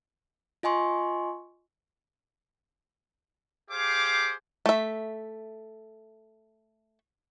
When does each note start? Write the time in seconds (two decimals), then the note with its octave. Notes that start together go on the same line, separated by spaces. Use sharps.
0.63 F4 D#5 G#5 C6 C#6
3.71 G4 G#4 C5 F5 D6
4.66 A3 E5